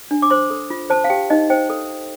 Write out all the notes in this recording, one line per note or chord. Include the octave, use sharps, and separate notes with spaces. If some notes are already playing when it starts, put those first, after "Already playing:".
D4
D6
C5 C6
A4
F4
C5 A5
F5
G4 G5
D#4 D#5
C5 G5
A4